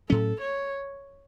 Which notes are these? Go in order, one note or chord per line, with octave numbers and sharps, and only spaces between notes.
A2 F#3 C#4 A4
C#5